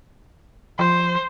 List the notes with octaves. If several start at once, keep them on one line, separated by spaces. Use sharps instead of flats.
F3 C5